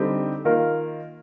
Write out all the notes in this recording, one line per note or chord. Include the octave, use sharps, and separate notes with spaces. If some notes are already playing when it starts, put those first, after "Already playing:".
Already playing: D3 G3 C4 D#4 G4
D#3 A#3 F4 A#4